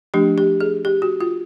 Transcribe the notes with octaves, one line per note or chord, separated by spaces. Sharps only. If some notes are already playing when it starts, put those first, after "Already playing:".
F3 A3 D4 G4
G4
G#4
G4
F#4
F4